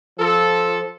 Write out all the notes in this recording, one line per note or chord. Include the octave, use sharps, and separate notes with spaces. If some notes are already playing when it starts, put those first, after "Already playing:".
F3 A4